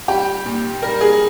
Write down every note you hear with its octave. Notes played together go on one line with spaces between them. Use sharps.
G3 G4
A#2
G3 A#4
G#4